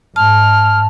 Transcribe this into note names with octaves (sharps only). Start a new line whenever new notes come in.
G#2 A5 F6